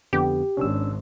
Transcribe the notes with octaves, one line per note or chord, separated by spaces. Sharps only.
F2 D3 B3 G4
G#1 C#4 D4 E6